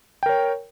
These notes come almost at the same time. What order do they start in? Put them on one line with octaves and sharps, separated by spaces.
G5 A#4 C#5